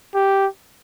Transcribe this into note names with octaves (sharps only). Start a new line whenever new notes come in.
G4